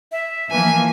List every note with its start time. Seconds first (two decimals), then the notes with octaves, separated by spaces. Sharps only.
0.12 E5
0.51 E3 F3 A#3 G#5